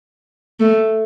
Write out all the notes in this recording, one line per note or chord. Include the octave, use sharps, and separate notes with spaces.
A3